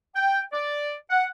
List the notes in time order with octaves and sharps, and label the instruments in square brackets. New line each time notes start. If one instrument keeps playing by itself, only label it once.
[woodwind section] G5
D5
F#5